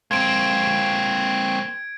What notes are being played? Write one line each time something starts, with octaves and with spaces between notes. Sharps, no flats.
A#3 C4 G#6 D7